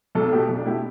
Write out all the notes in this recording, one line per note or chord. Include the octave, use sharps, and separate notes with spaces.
B1 A4
B2 A3 G4
B1
D4
B2 A3 E4 G4